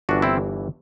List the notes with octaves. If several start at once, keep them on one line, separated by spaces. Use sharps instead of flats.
G1 G2 E3 D4 F#4
C4 E4